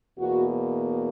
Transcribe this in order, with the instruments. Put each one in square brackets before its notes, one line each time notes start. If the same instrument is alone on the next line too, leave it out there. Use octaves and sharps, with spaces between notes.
[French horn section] E2 B2 A#3 F#4